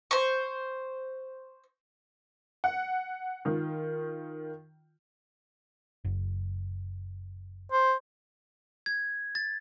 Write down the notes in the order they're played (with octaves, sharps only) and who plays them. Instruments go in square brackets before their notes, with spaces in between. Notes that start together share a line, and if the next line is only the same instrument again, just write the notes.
[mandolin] C5 C#6
[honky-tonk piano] F#5
D#3 F4
[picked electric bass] F#1
[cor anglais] C5
[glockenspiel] G#6
A6